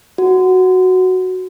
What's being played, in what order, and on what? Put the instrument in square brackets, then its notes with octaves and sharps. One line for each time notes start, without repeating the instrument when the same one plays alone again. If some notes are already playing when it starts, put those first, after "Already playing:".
[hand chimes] F#4